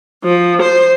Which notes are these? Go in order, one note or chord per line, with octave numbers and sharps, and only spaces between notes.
F3
C5